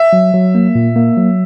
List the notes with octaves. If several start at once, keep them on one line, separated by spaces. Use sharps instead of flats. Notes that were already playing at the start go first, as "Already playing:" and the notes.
Already playing: E5
F#3
F#3
A#3
A#2
A#3
F#3